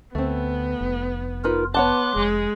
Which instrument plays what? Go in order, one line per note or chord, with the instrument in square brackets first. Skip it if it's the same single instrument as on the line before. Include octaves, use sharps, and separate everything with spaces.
[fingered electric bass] D2 [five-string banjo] A3 C4 [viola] B3
[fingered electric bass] F1
[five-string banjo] D#4 B4 [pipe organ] F4 A#4
[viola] B3 [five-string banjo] C#5 F#5 A5 [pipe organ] C6 D6 F#6
[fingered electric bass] F1 [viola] G#3